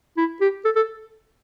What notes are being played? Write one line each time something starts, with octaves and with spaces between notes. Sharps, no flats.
E4
G4
A4
A4